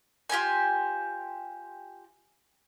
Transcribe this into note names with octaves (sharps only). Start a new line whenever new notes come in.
F4 G4 C5 G#5